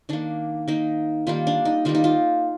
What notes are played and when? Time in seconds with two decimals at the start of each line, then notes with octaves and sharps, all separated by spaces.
0.09 D#3 A#3 D4
0.68 D#3 A#3 D#4
1.27 D#3 G3 A#3 F4
1.47 D4
1.65 D#4
1.85 D#3 G3 A#3 F4
1.95 D#4
2.04 F4